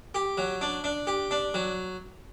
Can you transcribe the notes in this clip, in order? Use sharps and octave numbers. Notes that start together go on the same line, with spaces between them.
G4
F#3
D4
D4
G4
D4
F#3